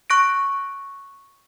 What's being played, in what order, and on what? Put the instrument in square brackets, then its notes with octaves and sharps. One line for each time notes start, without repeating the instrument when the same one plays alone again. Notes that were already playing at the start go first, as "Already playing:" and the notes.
[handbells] C#6 F#6 A#6 D7